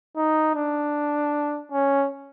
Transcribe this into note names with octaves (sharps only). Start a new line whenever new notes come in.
D#4
D4
C#4